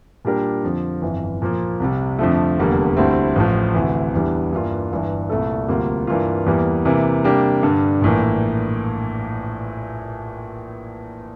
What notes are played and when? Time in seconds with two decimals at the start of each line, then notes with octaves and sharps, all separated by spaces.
0.25 A#2 G3 D4 G4 A#4
0.63 F2 D3 F3
1.02 G1 F2 E3
1.42 A#2 F3 A#3
1.80 C2 C3 G3
2.19 F2 D3 F3 A3
2.58 F1 E2 D3 G3 A#3
2.97 D2 D3 G3 C4 E4
3.36 A1 A2 F3
3.74 D2 C3 E3
4.14 E2 E3 G3 D4
4.53 G2 E3 A#3 F4
4.92 G1 G2 E3
5.29 C2 A#2 A3 E4 A4
5.68 D2 C3 G3 A#3 F4
6.07 G2 E3 A#3 F4
6.46 E2 E3 G3 A#3
6.85 C3 E3 A#3
7.24 C3 G3 A#3 D4 G4
7.62 G2 D3 G3 D4
8.01 A#1 A2 E3 A#3